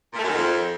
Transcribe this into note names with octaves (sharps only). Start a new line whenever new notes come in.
A#2
A3
F#2
D#3
F2